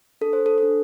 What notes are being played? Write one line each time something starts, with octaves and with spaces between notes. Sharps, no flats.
D4 A4
C5
A4
D4 A4